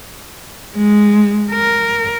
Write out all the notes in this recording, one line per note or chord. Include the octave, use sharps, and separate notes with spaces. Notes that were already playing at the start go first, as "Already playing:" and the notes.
G#3
A#4